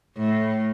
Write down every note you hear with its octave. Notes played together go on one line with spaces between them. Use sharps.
A2